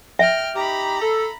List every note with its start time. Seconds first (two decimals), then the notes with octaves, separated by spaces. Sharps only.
0.19 E5 G5 F6
0.56 D#4 G4 A#5 B5
1.00 A4